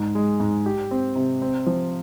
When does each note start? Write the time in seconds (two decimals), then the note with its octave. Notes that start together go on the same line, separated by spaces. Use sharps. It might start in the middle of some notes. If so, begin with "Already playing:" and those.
Already playing: G#2
0.15 G#3
0.40 G#2
0.66 G4
0.91 C4
1.15 C3
1.42 C4
1.66 F3